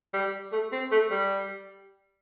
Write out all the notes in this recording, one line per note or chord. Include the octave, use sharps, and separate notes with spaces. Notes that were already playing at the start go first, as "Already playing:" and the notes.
G3
A3
C4
A3
G3